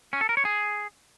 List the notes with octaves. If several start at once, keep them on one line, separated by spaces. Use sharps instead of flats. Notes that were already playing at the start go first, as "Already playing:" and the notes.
C#4
A4
A#4
C#5
G#4